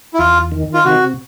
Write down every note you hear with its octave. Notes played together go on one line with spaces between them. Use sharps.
E4
E2 F4
D#3
F4
C3 F#4